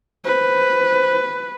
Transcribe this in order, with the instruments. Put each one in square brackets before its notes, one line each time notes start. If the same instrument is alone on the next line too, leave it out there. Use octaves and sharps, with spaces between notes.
[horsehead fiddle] B4 [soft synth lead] C5